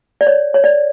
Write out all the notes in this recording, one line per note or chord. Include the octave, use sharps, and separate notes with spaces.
D5
C#5
C#5
D5